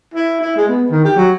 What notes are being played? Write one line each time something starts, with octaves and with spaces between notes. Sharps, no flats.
E4
E4
G#3
B3
D#3
G4
F#3